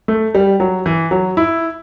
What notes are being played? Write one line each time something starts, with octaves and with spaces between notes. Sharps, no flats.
A3
G3
F#3
E3
F#3
E4